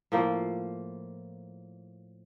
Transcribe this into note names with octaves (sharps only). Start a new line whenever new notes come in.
A2 F3 A#3